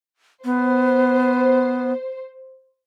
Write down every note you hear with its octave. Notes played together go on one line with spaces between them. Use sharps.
B3 C5